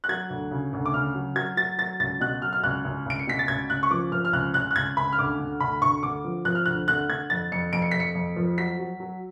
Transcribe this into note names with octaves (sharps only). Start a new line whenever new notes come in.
F#6
F#3 G#6
D2
C#3
D2
D6
C#3 F6
F#3
F#3 G#6
F#3 A6
F#3 A6
C#2 A6
B2 F#6
F#3 F6
F6
C#2 F#6
C#2
C#2 D7
C#7
B2 B6
A6
C#2 G#6
C#2 F#6
C#6
F3 D6
F3 F6
F6
C#2 F#6
C#2 F#6
F#6
C#2 G#6
C#2 B5
F6
D2 D6
D3
D2 B5
D2 C#6
D3 D6
F3
F3 F#6
F6
D2 F#6
D3 F#6
D3 G#6
F2 A6
F2 C#7
F2 D7
C#7
F2 B6
C#7
F2
F3
F#3 B6
F#3
F#3